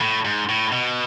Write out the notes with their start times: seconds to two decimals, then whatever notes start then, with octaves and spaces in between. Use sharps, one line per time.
0.01 A2
0.25 G#2
0.49 A2
0.73 B2